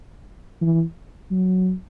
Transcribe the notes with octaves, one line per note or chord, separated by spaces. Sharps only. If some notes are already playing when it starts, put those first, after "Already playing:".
E3
F#3